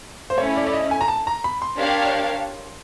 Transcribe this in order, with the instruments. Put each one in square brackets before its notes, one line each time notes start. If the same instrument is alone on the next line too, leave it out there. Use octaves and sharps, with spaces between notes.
[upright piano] C5
[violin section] A3 C#4 E4 [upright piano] C#5
[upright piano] D5
D5
D#5
G#5
A#5
A5
A#5
B5
C6
[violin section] D4 G4 A#4 C#5 F5